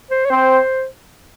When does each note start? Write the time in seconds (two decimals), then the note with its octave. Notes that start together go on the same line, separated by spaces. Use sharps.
0.10 C5
0.25 C#5
0.30 C4 C5